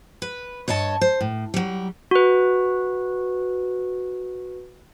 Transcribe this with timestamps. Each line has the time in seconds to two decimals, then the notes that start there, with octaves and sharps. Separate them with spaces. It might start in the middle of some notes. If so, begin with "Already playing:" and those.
0.22 B4
0.68 G2 C#5 D#5 A5
1.01 C5
1.21 A2
1.54 F#3 G3
2.11 F#4 B4